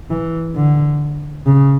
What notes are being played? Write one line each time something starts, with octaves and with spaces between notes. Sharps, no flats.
E3
D3
C#3